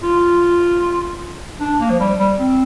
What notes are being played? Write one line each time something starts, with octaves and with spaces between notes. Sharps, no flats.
F4
D4
A#3
F3
G3
G3
C4